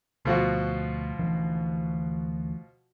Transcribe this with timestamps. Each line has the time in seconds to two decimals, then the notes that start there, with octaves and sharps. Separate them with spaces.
0.25 D2 B2 F3 F#4
1.19 D2 E3 D4